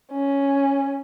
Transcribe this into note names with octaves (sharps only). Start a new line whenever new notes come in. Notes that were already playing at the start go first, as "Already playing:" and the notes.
C#4